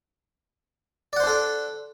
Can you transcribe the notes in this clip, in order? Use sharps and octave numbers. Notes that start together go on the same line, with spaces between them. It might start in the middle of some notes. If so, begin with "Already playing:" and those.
D4 A4 C5 D5 F#5